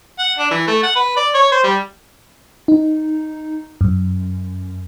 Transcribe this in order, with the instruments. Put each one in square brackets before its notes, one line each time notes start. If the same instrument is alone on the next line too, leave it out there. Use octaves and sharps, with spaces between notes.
[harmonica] F#5
D4
E3
A3
F#5
B4
D5
C#5
C5
G3
[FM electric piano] D#4
F#2